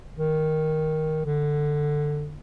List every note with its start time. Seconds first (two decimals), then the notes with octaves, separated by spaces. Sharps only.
0.15 D#3
1.25 D3